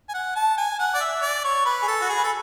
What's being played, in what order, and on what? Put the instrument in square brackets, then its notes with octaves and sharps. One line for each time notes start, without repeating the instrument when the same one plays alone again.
[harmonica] G#5
F#5
A5
G#5
F#5
D5
E5
D5
C#5
B4
G#4
A4
F#4
G#4
B4
A4